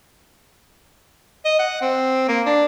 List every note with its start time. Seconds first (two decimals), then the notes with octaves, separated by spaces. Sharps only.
1.45 D#5
1.59 F#5
1.82 C4
2.29 A#3
2.46 D4